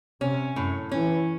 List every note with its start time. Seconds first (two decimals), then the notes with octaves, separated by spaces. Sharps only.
0.21 C3 C#4
0.56 F#2 A2
0.91 E3 C#4